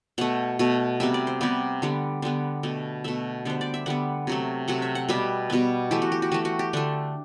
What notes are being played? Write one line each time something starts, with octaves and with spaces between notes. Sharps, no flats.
B2 A3 F#5
B2 A3
C3 G3 B3 E5
D5
C5
C3 G3 B3 D5
D3 G3 B3
D3 G3 B3
B2 A3
B2 A3 E5
D3 G3 B3 C5
D5
E5
D3 G3 B3 F#5
C3 F#3 A3
C3 F#3 A3 F#5
E5
F#5
B2 G3 B3 E5
B2 G3 B3
E3 A3 G4
F#4
G4
F#4
E3 A3 G4
F#4
G4
D3 A3 D4